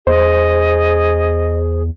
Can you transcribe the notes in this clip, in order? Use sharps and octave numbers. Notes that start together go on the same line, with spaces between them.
E2 G#4 C5 D#5